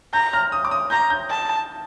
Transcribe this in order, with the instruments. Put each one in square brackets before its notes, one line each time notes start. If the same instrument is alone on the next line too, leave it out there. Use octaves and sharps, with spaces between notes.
[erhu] A#5 [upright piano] G6
[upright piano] F6
D#6
D6
D#6
[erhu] A#5 [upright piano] G6
[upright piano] G6
[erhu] A5